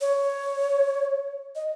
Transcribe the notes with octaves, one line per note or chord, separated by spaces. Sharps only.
C#5
D#5